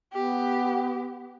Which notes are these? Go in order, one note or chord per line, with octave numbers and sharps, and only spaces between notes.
B3 G4